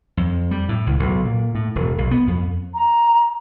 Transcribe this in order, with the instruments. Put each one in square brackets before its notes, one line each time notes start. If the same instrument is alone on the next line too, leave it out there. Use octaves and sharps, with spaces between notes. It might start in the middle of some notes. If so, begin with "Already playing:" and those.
[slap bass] F2
G3
A2
C#2
B1
A#2
A2
E1
B1
B3
F2
[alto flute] A#5